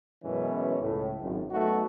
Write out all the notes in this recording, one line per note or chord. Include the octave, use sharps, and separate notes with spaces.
F#2 B2 E3 G#3 C#4
C#2 A2
G#1 F#2
F#3 A3 B3 D#4 F#4